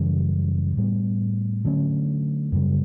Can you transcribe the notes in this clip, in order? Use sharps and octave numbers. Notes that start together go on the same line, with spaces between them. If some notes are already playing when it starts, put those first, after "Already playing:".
Already playing: F#2 C#3 E3 G3
A2 G3 B3
D3 F#3 A3 C#4
F#2 C#3 G3